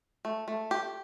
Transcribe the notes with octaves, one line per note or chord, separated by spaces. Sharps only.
A3
A3
G4